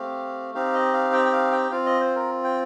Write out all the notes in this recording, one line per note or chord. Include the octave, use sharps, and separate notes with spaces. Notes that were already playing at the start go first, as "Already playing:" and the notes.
Already playing: A3 C4 G4 F5
C4 D#4 G4 F5
D#5
F5
G5
G5
F5
G5
C4 F4 F5
D#5
C5
A#4
G5